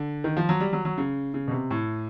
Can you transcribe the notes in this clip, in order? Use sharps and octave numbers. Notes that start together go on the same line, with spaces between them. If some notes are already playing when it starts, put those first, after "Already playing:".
Already playing: D3
D#3
F3
F#3
G3
F#3
F#3
C#3
C#3
B2
C3
A2